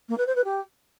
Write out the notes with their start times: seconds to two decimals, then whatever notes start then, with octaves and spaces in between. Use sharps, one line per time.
0.09 A#3
0.18 B4
0.27 C5
0.35 B4
0.44 G4